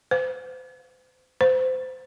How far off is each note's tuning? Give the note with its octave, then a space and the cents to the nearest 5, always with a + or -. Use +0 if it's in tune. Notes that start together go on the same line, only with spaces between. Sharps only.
C5 -40
C5 -25